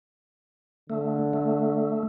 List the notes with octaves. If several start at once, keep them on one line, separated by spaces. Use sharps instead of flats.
D3 A3
A3